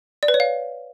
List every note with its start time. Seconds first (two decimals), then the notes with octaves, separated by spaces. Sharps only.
0.23 D5
0.28 B4
0.34 C#5
0.40 F5